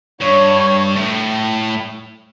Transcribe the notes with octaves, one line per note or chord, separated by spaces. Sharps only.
G2 C#5
A2